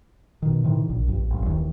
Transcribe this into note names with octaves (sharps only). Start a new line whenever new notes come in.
B2 D#3
A2 C3 D#3 E3
A#1
A#1 G2
A1 G2
D#1 D#2 E3